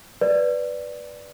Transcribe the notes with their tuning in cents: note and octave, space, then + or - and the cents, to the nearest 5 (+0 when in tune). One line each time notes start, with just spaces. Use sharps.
B4 +0 D5 +0